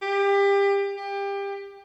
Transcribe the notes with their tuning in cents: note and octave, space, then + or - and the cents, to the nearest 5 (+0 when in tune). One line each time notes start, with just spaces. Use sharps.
G4 +25
G4 +25